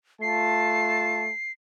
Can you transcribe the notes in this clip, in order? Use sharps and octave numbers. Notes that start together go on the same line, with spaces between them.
A3 F4 A5 C7